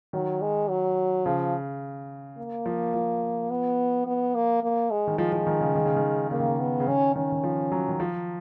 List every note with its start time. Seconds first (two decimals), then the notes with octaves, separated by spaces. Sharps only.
0.13 D#3 F#3
0.41 G#3
0.69 F#3
1.25 C#3 F3
2.38 A#3
2.66 F3
2.94 F3
3.50 B3
4.06 B3
4.35 A#3
4.63 A#3
4.91 G#3
5.07 D#3
5.18 F3 G#3
5.32 F3
5.47 D#3
5.61 C#3
5.76 D#3
5.85 C#3
5.96 D#3
6.31 C#3 A#3
6.40 D#3
6.47 C#3
6.59 B3
6.80 C#3
6.87 D#3 C#4
7.15 D#3 C#4
7.32 D#3
7.44 F3
7.72 F#3
7.88 D#3
8.00 F3